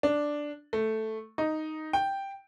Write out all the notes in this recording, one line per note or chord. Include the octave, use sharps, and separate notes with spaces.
D4
A3
D#4
G5